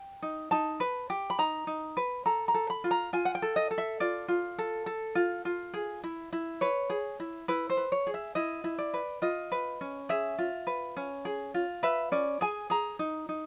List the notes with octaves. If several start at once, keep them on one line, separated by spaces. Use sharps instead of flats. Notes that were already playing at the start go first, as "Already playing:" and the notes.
Already playing: G5
D#4
D#4 A5
B4
G4
B5
D#4 A#5
D#4
B4
A4 A#5
A#5
A4
B5
F4
A#5
F4 G#5
F#5
G5
A4
D#5
A4
E5
F4 D5
F4
A4
A4
F4
F4
G#4
E4
E4
B4 C#5
G#4
E4
E4 B4
C5
B4
C#5
G#4
E5
E4 D#5
E4
D5
B4
F4 D#5
B4
C#4
G#4 E5
F4
B4
C#4
G#4
F4
B4 E5
C#4 D5
G#4 G#5
G#4 A#5
D#4
D#4